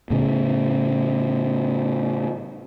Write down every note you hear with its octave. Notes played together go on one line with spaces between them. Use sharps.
A2 C#3